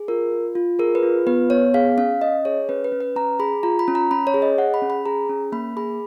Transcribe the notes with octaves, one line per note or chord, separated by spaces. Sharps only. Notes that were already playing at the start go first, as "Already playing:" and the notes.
Already playing: G#4
F4 A#4
F4
F4
G#4 A#4
B4
F4
B3 B4
B3 C#5
G#4 F5
C#4 F5
C#4 D#5
G#4 C#5
C#4 B4
B4
C#4
B4
C#4 A#5
G#4 B5
F4 A#5
B5
C#4
A#5
C#4 B5
C#5
G#4
D#5
G#4 F#5
B5
C#4
B5
G#4 A#5
C#4
A#3 B5
G#4 B5